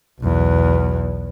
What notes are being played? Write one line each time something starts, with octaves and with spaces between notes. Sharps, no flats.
B1 E2